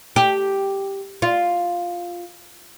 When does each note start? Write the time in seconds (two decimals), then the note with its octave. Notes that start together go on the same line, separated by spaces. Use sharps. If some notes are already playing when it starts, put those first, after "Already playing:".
0.16 G4
1.22 F4